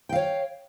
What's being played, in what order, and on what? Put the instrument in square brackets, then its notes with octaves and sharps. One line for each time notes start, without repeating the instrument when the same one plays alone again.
[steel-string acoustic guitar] G5
F5
C#5